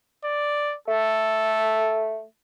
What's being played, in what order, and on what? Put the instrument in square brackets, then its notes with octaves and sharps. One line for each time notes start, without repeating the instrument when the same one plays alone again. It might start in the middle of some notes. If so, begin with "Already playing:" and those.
[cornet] D5
[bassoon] A3 [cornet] A4